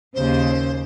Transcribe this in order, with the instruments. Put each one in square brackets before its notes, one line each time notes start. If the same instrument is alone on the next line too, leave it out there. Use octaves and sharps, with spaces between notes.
[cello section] D#2 C#3 [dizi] C5